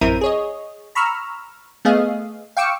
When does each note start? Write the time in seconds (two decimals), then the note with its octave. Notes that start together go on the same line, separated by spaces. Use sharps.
0.01 A1 F#2 C4 E4 A#4 D#7
0.21 G#4 C#5 D#5
0.95 A#5 B5 C#6 E6 F6
1.85 A3 B3 G#4 D#5 F5
2.57 F5 G5 C#6 D6 E6 C#7